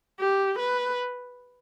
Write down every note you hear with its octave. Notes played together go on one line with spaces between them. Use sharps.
G4
B4